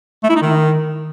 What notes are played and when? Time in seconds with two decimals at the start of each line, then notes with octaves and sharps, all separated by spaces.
0.23 A3
0.30 E4
0.36 D#4
0.42 D#3